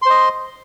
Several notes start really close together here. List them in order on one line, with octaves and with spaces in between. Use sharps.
C6 C5 D#5